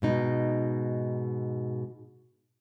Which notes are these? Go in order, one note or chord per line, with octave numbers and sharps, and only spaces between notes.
G#2 B2 D#4